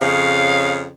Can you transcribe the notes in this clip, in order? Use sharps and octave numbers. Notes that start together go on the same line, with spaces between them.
F2 C#3 F5